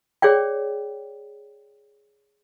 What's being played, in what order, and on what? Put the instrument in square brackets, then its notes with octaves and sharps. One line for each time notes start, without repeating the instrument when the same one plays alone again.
[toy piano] G#4 C#5 D5 G5